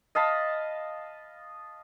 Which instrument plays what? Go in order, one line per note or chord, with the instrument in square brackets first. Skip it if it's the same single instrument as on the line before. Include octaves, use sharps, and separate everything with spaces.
[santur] D#5 F5 A5 B5